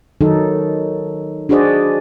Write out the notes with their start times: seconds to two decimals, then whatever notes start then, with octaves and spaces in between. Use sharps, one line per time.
0.21 D#3 F#3 D#4 A4
1.49 D4 F#4 G#4 C5 D5 D#5